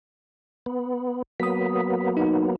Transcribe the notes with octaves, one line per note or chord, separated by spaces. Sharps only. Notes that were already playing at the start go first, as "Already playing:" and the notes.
B3
F#3 A#3 B3 D#6 B6
D#4